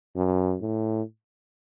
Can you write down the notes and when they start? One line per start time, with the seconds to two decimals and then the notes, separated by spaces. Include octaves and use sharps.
0.16 F#2
0.62 A2